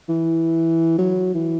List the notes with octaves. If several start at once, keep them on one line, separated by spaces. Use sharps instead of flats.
E3
F#3
E3